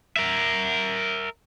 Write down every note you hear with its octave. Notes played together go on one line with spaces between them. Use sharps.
A#4 E5